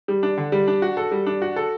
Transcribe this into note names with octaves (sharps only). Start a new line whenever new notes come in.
G3
D4
D3
G3
D4
F#4
A4
G3
D4
F#4
A4